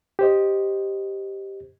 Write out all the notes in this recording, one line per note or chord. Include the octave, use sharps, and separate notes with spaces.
G4 C5 D#5